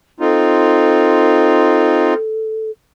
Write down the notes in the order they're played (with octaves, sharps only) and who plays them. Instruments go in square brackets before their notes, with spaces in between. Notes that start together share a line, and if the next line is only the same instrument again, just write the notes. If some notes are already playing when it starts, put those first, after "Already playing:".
[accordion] C4 D#4 F4 [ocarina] A4